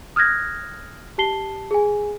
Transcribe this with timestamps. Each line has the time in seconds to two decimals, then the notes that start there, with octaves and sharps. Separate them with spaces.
0.16 D#6 F6 F#6 G#6 A#6
1.18 G4 A5 C7 G7
1.71 G#4 G#5